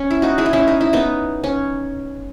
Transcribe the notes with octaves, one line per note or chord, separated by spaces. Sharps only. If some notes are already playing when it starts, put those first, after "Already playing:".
Already playing: C#4
E4
D#4 F#4
E4 G#4
D#4
C#4 E4
D#4
E4
B3 D#4
C#4